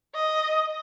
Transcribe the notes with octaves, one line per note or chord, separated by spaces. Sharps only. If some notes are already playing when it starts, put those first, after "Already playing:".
D#5